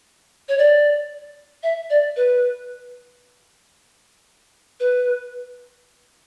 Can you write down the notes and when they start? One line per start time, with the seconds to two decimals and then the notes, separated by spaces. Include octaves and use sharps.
0.49 C#5
0.58 D5
1.63 E5
1.90 D5
2.16 B4
4.80 B4